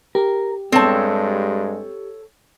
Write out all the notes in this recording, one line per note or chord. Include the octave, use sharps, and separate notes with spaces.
G4 A#4
G2 G#3 C4 A4 C#5 A5